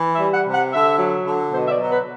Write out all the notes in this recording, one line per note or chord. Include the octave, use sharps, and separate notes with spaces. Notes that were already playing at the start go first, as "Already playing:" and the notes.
Already playing: E3
E5
G3
F#5
C3
F#5
D3 E5
F#3
D3
B2 C5
E5
D5
F#3
B4